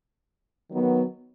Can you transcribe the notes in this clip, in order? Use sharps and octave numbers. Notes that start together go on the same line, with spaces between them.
D#3 F#3 B3